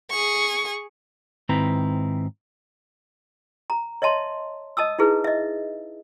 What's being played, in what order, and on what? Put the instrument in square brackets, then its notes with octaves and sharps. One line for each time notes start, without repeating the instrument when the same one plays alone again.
[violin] G#4 C#6
[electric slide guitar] G#2 D#3 C4 E4 B4 A#5
[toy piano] A#5
C#5 D#5 E5 A5 C6
D#5 A5 D#6 E6
D#4 E4 G#4 B4
D#5 E5